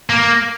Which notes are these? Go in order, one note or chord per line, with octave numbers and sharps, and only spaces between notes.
A#3